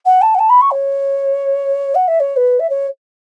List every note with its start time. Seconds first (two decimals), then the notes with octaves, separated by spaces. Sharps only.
0.05 F#5
0.21 A5
0.34 F#5
0.39 A5
0.49 B5
0.61 C#6
0.71 C#5
1.94 F#5
2.07 E5
2.20 C#5
2.36 B4
2.59 E5
2.69 C#5